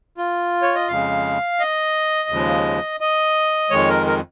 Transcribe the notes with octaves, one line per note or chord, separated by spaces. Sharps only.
F4
C#5
D#5
F2 C#3 G#3 F5
D#5
D#2 C#3 F3 G#3
D#5
F2 D#3 G#3 C#5
A#4
A#4